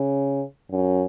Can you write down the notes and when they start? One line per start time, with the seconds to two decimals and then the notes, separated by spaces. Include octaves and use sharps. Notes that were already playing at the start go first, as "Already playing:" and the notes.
Already playing: C#3
0.72 F#2